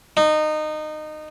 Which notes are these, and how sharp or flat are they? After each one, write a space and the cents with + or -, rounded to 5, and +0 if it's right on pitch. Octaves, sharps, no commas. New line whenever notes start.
D#4 -20